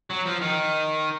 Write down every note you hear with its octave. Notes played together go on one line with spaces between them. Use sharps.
F#3
F3
D#3